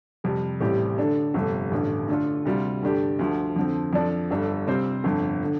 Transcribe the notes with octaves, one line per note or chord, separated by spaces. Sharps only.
F2 C3 G3
A1 A2 G3 C4 G4
D3 A3 D4 A4
G1 F2 C3 A3
A1 G2 D3 A3
D3 A3 D4 F4 A4
D2 C3 G3 F4
G2 D3 A3 D4 G4
D2 D3 F3
F2 D3 F3 C4
F2 F3 D4 A4 D5
G1 G2 G3 D4 A4
C3 G3 C4 F4 C5
G1 F2 D3
D3